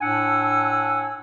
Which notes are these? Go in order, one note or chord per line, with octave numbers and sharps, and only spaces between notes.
A2 D4 F#5 G#5 E6